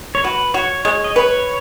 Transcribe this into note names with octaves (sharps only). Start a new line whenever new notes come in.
C#5
F#4 B4
F#4 C#5
G#3 C#5
D#5
B4 C#5